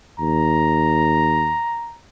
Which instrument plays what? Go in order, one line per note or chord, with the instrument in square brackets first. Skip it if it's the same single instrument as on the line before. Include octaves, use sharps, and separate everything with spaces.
[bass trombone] D#2 [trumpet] A#5